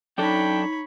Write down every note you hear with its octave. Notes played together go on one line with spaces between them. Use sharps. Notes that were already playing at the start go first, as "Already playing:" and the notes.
F#2 D4 D#4 A4 C#5 G5 B5